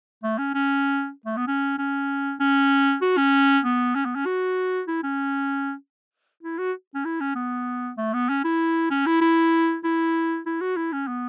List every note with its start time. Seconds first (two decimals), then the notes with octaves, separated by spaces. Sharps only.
0.23 A3
0.38 C#4
0.55 C#4
1.26 A3
1.37 B3
1.48 C#4
1.78 C#4
2.40 C#4
3.02 F#4
3.17 C#4
3.65 B3
3.95 C#4
4.05 B3
4.16 C#4
4.26 F#4
4.88 E4
5.03 C#4
6.43 E4
6.58 F#4
6.95 C#4
7.05 E4
7.21 C#4
7.35 B3
7.97 A3
8.14 B3
8.29 C#4
8.44 E4
8.91 C#4
9.06 E4
9.22 E4
9.84 E4
10.46 E4
10.61 F#4
10.77 E4
10.93 C#4
11.08 B3